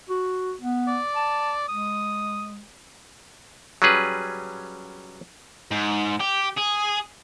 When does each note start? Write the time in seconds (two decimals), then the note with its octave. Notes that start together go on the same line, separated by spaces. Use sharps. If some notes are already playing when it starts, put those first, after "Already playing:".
0.09 F#4
0.61 B3
0.88 D5
1.15 A5
1.68 G#3 D#6
3.82 F#3 G3 C#4 G#4 B4
5.71 G#2
6.21 G4
6.58 G#4